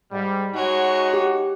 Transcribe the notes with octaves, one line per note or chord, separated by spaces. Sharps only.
G#2 G3
G#3 D#4 F#4 C#5
G4